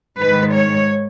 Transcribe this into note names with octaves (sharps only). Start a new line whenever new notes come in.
G#2 D#3 G#3 B4
C#5